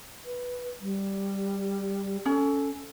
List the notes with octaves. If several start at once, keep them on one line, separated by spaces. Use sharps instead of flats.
B4
G3
C#4 A4